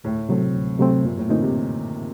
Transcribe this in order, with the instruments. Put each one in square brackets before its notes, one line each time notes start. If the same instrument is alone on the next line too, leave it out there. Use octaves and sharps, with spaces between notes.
[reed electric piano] D2 [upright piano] A2
[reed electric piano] C3 F#3 A3 C4
D2
C3 F#3 A3 C4
[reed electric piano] F#2 [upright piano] A#2
[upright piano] A2
[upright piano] A#2 [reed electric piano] D3 A3 C4 D#4
[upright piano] C3